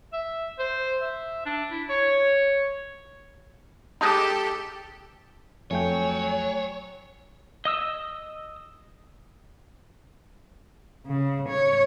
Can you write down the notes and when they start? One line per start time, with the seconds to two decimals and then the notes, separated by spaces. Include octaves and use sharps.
0.13 E5
0.59 C5
1.01 E5
1.46 D4
1.71 E4
1.90 C#5
4.01 G#3 D#4 G4 A4 A5 D6
5.71 F2 F#3 A3 C#5 G5 G#5
7.65 D#5 D#6 E6
11.06 C#3
11.50 C#5